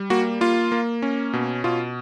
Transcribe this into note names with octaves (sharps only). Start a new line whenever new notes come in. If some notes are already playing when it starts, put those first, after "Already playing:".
Already playing: G3
A#3 F#4
A#3 F4
A#3
C#4
B2
B2 F4